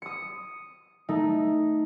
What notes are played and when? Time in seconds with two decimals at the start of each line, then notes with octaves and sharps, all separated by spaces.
0.02 D#6 C#7
1.09 A3 D#4